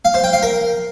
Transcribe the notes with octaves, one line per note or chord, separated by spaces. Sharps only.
F5
C5
G5
F5
A#4